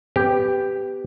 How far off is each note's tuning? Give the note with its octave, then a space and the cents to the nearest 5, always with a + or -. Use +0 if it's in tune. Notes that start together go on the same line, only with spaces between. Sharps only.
B3 +20 G4 +0